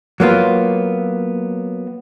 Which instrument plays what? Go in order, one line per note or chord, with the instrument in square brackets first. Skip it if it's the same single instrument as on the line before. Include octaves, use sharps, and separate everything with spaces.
[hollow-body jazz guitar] F#3 A#3 B3 F4